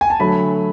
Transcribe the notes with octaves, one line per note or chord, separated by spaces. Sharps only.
G#5
A5
D3 F#3 A3 B5